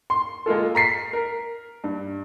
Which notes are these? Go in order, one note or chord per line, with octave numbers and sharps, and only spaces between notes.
C6
G#3 A#3 F4 A4
A#5 B6 C7
A#4
G2